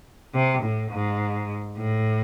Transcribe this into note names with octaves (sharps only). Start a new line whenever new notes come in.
C3
A2
G#2
A2